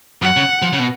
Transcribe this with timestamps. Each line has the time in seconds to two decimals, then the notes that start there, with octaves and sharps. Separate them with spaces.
0.22 F#2 F#5
0.37 C#3
0.62 F3
0.73 C#3
0.79 B2